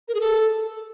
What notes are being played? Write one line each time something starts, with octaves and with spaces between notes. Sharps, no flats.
A#4
G#4
A4